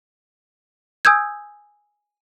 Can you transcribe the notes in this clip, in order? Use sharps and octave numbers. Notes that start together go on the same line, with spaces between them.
G#5 D#6 E6 G6 G#6